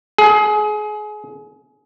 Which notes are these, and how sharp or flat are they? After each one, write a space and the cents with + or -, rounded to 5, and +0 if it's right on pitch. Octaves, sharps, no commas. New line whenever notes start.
G#4 +25